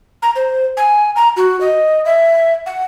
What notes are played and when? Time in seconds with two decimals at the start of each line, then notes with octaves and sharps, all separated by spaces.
0.22 A#5
0.36 C5
0.77 G#5
1.16 A#5
1.37 F#4
1.61 D#5
2.05 E5
2.66 F#5